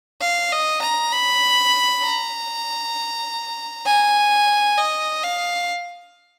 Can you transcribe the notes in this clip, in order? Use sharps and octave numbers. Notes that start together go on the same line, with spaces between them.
F5
D#5
A#5
B5
A#5
G#5
D#5
F5